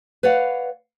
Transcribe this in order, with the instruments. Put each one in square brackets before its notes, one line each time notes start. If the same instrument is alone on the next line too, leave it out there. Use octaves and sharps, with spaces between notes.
[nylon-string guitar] B4 C#5 D5 F5 F#5